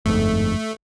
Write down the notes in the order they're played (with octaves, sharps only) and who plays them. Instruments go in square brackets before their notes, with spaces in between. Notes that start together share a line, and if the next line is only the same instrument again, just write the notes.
[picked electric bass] G1 F2 G#2 [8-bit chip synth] A3